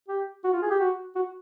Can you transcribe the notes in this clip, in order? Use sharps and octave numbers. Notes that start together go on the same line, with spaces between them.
G4
F#4
F4
G#4
G4
F#4
F#4